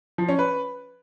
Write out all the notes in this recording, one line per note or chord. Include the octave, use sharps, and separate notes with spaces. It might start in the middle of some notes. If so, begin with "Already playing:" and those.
F3
C#4
B4